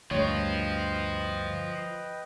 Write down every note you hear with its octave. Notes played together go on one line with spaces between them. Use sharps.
D2 G2 F3 F4 B4 C#5 D#5 G5